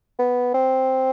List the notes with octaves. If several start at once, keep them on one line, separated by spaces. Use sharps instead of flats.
B3
C4